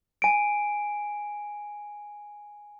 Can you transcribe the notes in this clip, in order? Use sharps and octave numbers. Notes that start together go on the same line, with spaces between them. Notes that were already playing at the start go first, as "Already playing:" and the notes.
G#5 D7